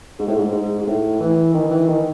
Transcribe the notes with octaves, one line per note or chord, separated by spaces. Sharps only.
G#2
A2
G#2
G#2
G#2
A2
E3
D#3
E3
D#3